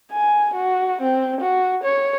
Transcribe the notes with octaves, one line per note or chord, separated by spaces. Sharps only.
G#5
F#4
C4
F#4
C#5